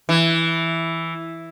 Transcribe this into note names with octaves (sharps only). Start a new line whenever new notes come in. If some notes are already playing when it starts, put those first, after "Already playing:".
E3